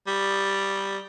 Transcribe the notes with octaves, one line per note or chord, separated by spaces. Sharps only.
G3